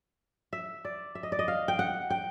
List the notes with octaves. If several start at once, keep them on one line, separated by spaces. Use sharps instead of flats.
E5
D5
E5
D#5
D5
D#5
F5
G5
F#5
G5